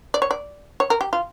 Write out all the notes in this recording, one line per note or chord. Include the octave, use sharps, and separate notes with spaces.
D5
C#5
D5
C#5
A#4
G4
F4